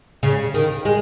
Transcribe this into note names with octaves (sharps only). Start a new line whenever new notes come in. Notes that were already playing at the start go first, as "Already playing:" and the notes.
C#3
D#3
G#3